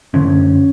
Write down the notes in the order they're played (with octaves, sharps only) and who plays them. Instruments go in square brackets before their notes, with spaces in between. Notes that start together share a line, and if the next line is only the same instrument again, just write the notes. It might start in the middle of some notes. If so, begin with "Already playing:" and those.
[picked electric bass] F#2 D3 C#4